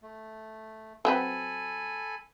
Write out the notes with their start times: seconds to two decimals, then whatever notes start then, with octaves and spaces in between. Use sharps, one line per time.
0.03 A3
1.05 F#3 C4 A4 B4 G#5 B5